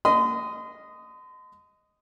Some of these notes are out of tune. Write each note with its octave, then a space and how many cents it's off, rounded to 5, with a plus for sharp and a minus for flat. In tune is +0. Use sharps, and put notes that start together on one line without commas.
D#5 +0 C6 -40 D#6 +0